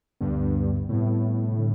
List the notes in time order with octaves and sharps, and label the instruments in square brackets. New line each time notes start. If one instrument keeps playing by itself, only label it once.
[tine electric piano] D2 D3 G3 B3 [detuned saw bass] G2
[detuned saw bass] A2 [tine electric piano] C3 G3 B3
[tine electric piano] D3 G3